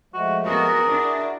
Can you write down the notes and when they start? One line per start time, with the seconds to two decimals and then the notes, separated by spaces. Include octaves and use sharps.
0.14 F3 G#3 A3 F#4
0.46 B3 F#4 G#4 A#4
0.88 D4 E4 F#4